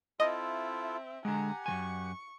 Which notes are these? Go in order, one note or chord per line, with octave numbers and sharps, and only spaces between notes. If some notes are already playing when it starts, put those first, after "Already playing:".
C4 E4 F4 A4 D#5 E5
D3 G#3 G4 F#5 G#5 A#5
F#2 E3 G#5 C#6